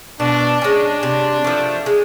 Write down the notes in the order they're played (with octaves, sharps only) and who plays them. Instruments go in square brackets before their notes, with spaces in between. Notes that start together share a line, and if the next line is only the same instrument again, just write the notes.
[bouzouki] B2 [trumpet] D4
[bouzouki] G#3 C#4 [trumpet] D4
[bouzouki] C3
F3 A3
G#3